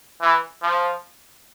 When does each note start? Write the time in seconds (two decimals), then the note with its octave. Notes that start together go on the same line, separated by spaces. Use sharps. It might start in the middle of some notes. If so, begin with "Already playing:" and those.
0.21 E3
0.62 F3